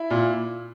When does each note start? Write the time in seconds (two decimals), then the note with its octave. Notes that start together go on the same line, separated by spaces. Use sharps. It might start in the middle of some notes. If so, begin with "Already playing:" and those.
Already playing: E4
0.10 A#2